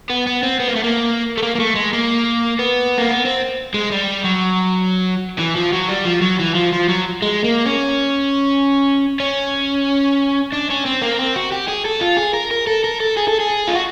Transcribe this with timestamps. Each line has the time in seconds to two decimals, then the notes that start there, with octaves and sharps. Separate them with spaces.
0.10 B3
0.27 B3
0.43 C4
0.59 B3
0.68 A#3
0.76 A3
0.84 A#3
1.37 A3
1.42 A#3
1.55 A#3
1.60 A3
1.75 G#3
1.93 A#3
2.59 B3
2.98 A#3
3.11 B3
3.25 C4
3.74 G#3
3.91 G3
4.24 F#3
5.39 E3
5.56 F3
5.73 F#3
5.89 G3
6.06 F3
6.22 F#3
6.40 E3
6.55 F3
6.73 F3
6.89 F#3
7.22 G#3
7.44 A#3
7.66 C#4
9.20 C#4
10.52 D4
10.70 C#4
10.85 C4
11.02 A#3
11.19 C4
11.36 F#4
11.52 G4
11.68 G#4
11.86 A4
12.01 F4
12.17 G#4
12.34 A#4
12.51 A#4
12.67 A4
12.84 A#4
13.00 A4
13.17 G#4
13.28 A4
13.40 G#4
13.68 F4
13.75 F#4